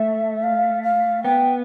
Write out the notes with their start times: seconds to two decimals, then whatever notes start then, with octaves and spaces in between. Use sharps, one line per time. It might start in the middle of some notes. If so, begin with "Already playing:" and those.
Already playing: A3 E5
0.43 F5
0.83 F5
1.23 B3 G5